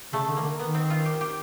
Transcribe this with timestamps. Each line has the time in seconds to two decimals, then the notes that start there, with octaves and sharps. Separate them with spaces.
0.13 C#3 A3
0.28 D3
0.37 D#3 A#3
0.44 D3
0.59 D#3 B3
0.74 C4
0.90 F4
1.05 G4
1.21 G4